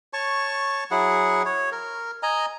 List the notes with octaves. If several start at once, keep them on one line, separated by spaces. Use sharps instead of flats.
C#5 A5 C#6
F#3 E4 G#4 F#5
C#5
A#4
D#5 G#5 A#5